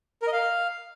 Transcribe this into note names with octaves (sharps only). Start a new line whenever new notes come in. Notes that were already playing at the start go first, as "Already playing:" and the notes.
A#4
D#5
F5